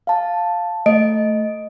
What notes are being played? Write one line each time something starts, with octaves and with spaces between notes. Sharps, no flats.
F5 A5
A3 D#5 D7